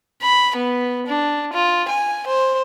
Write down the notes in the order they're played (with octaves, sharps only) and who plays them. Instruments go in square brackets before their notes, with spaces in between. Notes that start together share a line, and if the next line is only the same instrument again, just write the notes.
[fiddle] B5
B3
D4
F4
G#5
C5